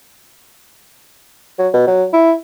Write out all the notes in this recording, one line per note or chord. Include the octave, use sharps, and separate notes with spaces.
F#3
B2
F#3
E4